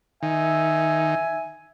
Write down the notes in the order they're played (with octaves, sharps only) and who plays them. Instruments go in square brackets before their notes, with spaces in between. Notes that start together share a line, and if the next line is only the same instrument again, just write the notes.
[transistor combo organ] D#3 [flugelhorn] E5 [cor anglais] G#5